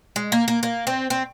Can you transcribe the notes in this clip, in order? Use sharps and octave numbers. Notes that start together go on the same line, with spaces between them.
G#3
A#3
A#3
A#3
C4
C4